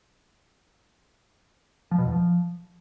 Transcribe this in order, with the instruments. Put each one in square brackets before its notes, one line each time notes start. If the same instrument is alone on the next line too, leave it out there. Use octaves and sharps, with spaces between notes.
[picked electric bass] F3
B2
E2
F3